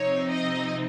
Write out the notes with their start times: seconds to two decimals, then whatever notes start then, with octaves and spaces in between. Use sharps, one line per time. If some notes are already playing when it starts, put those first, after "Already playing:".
Already playing: C3 F3 C4 D#4 C#5
0.31 D#5